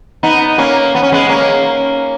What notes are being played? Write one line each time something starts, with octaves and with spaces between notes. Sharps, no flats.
B3 D#4
A#3 C#4
B3
C#4
G#3 B3
A#3 C#4